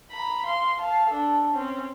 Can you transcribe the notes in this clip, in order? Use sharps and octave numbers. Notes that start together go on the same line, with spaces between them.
A#5 B5
F5 C6
F5 A5
D4 A4
C4 C#4